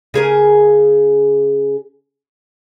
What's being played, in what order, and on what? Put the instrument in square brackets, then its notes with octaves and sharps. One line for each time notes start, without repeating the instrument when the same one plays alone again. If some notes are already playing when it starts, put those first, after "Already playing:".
[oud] C#3 G#4 A#4